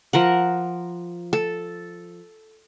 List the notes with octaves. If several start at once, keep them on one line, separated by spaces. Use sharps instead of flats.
F3 A#4 F#5
A4